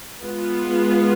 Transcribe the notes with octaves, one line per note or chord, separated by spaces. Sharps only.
G#3 B3 F4